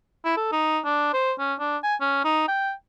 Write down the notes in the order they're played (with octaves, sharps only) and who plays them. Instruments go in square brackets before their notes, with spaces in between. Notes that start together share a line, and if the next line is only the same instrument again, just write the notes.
[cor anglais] E4
A4
D#4
D4
C5
C#4
D4
G#5
C#4
D#4
G5